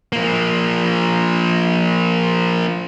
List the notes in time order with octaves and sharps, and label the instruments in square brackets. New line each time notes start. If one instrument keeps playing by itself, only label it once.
[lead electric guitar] F3 A#3